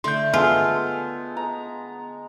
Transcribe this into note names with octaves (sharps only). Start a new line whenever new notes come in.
D3 A3 C6 G6
G#3 B3 F4 A4
A#5